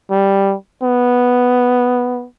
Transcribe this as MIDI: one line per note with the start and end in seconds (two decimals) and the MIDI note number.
0.11 0.55 55
0.83 2.26 59